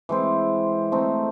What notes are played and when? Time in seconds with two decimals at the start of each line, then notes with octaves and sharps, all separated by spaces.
0.09 E3 G#3 C4
0.92 A3 C4 D#4